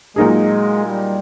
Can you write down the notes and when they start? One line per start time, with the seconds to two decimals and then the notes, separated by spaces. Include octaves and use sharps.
0.16 A#2 F#3 G#3 A#3 D#4 G#4
0.86 G3